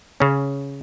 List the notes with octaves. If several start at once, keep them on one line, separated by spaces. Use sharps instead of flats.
C#3 C#4